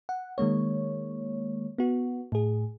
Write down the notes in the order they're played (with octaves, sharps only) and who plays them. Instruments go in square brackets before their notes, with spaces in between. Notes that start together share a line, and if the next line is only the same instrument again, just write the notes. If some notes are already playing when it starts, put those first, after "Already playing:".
[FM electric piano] F#5
D#3 G#3 A#3 C#5
B3 F#4
A2 G#4